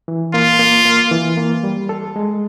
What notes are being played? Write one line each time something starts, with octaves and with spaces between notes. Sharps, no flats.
E3
A#3 F4
A#3
A#3
E3
A#3
G3
A4
G#3